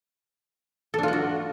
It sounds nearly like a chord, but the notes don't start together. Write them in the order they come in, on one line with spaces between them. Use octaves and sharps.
A4 D4 F4 F#5 F#4